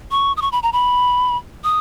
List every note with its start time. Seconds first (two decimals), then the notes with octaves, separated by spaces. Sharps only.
0.11 C#6
0.37 D#6
0.42 C#6
0.52 B5
0.63 A#5
0.73 B5
1.64 D#6